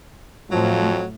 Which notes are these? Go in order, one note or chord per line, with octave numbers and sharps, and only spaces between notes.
F2 A2 F3 F#3